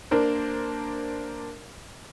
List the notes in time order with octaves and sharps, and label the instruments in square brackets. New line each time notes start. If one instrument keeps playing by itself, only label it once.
[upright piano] A#3 D4 A#4 C5